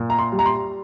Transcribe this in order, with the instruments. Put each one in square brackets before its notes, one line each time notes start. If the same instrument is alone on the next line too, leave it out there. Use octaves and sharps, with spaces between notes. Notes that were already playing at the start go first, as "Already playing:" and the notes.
Already playing: [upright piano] A#2
A#5
C6
G3
A#5
C6